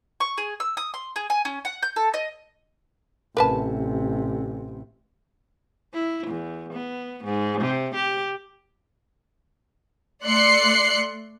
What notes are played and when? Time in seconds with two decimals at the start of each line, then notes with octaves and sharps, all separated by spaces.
0.20 C#6
0.38 G#4
0.60 E6
0.77 D#6
0.94 C6
1.16 G#4
1.30 G#5
1.45 C#4
1.65 F#5
1.83 G6
1.96 A4
2.14 D#5
3.37 A1 C3 A#4 B4 A5
5.94 E4
6.27 E2
6.73 B3
7.24 G#2
7.61 C3
7.95 G4
10.23 A3 D5 C6 F#6 C7 C#7